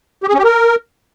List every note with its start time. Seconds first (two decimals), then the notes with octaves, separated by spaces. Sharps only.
0.23 G4
0.29 G#4
0.34 C#4
0.39 G4
0.44 A#4